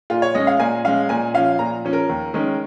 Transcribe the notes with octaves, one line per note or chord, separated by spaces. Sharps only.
A#2 F4
C#5
G#3 C#4 D#5
F5
A#2 G#5
G#3 C#4 F5
A#2 G#5
F3 C#4 F5
A#2 A#5
F3 C#4
A#4
D#2
D#3 G#3 C#4